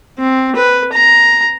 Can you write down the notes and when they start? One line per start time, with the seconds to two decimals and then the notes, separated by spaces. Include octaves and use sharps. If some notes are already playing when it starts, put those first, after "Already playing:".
0.19 C4
0.56 B4
0.93 A#5